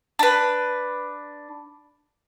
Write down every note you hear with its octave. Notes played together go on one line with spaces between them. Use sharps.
D4 B4